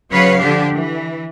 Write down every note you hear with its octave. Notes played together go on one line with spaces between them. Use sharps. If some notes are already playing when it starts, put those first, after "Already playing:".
C#3 F#3 B4 C#5 F5
D3 F3 D4 G4
E3